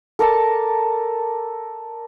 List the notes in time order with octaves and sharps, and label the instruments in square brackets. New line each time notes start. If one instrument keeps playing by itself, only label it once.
[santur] A4 A#4 D5 A5